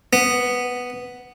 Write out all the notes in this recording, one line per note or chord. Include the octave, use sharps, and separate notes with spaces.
B3